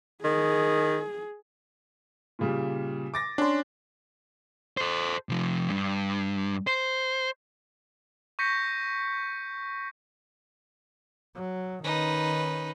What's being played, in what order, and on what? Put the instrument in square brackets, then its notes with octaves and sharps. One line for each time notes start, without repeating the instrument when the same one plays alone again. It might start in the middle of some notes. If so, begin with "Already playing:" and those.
[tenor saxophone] D#3 [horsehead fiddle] G#4
[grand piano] A#2 C#3 G3
D6 A6 A#6
[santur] C#4 C6 [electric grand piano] D4
[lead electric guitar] A4 C5
C3 F3
G2
C5
[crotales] C#6 G6 A#6 B6 C#7
[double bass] F#3
[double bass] D#3 C#4 [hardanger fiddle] D#4 B4